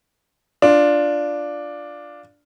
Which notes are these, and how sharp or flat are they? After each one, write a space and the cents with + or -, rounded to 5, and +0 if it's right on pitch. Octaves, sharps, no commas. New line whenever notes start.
D4 +0 F4 +0